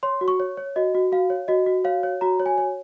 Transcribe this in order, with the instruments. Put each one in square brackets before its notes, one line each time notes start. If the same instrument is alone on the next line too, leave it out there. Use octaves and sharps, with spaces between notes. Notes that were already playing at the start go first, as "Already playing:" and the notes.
[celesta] C#5 C6
F#4
C#6
C#5
C#5
F#4 D#5
F#4
F#4 F5
C#5
F#4 D#5
F#4
C#5 F5
C#5
F#4 A#5
C#5
G#5
C#5